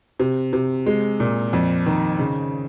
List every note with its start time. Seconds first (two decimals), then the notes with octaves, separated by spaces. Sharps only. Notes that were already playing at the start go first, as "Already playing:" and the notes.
0.19 C3
0.53 C3
0.86 G#3
1.20 A#2
1.53 F2
1.86 D#3
2.19 C#3